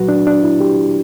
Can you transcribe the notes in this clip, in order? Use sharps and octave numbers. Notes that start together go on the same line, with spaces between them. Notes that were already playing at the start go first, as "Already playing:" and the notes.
Already playing: A#2 F#3 F#4 B4
D4
D4
E4
G4